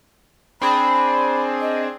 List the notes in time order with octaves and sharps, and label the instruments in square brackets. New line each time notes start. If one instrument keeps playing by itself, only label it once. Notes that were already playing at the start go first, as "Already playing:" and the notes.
[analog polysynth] C4 D4 G#4 [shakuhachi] B5
[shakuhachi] D#5